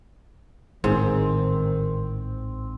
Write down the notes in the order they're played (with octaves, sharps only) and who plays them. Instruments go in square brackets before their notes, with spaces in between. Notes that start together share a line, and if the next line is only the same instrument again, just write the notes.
[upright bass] A1 [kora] G#2 [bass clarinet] D#3 [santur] C4